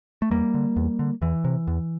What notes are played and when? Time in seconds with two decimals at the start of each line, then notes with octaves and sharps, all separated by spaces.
0.22 A3
0.31 E2 G3 A#3
0.54 D3
0.76 E2
0.99 D3
1.22 E2 E3
1.44 C3
1.67 E2